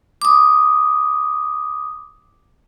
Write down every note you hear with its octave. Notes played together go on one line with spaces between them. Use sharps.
D6 D#6